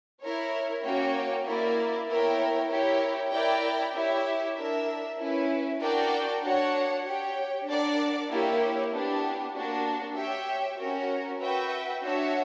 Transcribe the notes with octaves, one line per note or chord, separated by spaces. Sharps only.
E4 A#4 C#5
A#3 C#4 F#4 C#5 G5
A#3 E4 A#4 D5
B3 E4 A#4 C#5 G5
E4 G4 A#4 C#5 G5
E4 A#4 D5 G5
E4 G4 C#5 E5
D4 A#4 E5
C#4 E4 B4
D4 F#4 A#4 D5 G5
D4 F#4 C#5 F#5
G4 C#5 G5
D4 A#4 D5 F#5
A#3 E4 G4 C#5
B3 D4 G4
A#3 D4 F#4
G4 C#5 E5 G5
C#4 F#4 A#4
F#4 B4 E5 G5
D4 F#4 C#5 E5